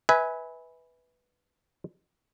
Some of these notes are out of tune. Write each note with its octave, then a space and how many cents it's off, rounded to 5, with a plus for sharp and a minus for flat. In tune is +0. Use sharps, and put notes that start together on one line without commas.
B4 +0 E5 -30 G#5 +0